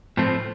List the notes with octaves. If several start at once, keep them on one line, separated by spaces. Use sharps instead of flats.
A2 F3 A3 C4